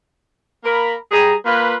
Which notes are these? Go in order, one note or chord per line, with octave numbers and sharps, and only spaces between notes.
A#3 A#4 B5
G3 G#4 A#5
A#3 F4 B4